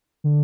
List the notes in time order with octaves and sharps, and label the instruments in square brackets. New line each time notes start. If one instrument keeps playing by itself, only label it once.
[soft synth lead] D3